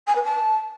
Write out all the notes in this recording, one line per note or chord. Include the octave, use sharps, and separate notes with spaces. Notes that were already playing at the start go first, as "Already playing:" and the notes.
G#5
B4
A5